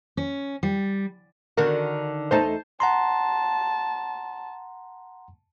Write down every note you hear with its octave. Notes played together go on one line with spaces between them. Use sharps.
C#4
G3
D3 D#3 F#4 A#4
E2 A3 D#4 C5 A5
F#5 A5 A#5 C6